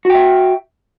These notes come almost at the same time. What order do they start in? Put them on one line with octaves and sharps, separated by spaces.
F#4 G5 E5